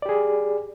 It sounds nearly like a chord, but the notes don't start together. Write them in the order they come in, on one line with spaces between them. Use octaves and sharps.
D5 G4 G#4